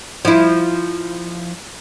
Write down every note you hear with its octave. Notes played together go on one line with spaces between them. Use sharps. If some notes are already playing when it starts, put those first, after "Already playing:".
F3 E4